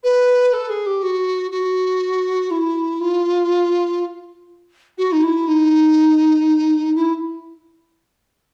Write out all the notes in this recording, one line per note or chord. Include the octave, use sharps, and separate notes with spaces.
B4
A4
G#4
G4
F#4
F#4
E4
F4
F#4
D#4
E4
D#4
E4